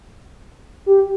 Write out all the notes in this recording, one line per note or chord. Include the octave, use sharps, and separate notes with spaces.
G4